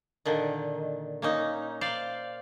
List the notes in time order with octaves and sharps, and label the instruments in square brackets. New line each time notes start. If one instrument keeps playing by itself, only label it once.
[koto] A#2 D3 D#3
A#3 C#4 D#4
C5 D5 F5